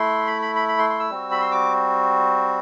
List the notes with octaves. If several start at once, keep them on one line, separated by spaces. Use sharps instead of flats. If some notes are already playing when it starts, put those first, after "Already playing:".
Already playing: A3 E4 C6
B5
B5
B5
B5
C6
C6
E6
G3 C4 F#4
B5
C6
D6